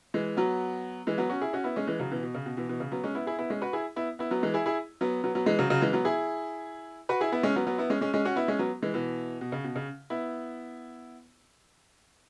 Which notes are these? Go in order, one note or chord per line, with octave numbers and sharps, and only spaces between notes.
E3 G#3
F#3 B3
E3 G#3
F#3 B3
C#4 F#4
E4 G#4
C#4 F#4
B3 E4
G#3 C#4
E3 G#3
C#3 F#3
B2 E3
B2
C#3
B2
B2 E3
B2 E3
C#3
F#3 B3
G#3 C#4
B3 E4
E4 G#4
B3 E4
G#3 C#4
F#4 B4
E4 G#4
B3 E4
B3 E4
F#3 B3
E3 G#3
E4 G#4
E4 G#4
F#3 B3
F#3 B3
F#3 B3
E3 G#3
C#3 F#3
C#3 F#3
E3 G#3
F#3 B3
E4 G#4
F#4 B4
E4 G#4
B3 E4
G#3 C#4
F#3 B3
F#3 B3
B3 E4
G#3 C#4
G#3 C#4
G#3 C#4
C#4 F#4
B3 E4
G#3 C#4
F#3 B3
E3 G#3
B2 E3
B2
C#3
B2
C#3
B3 E4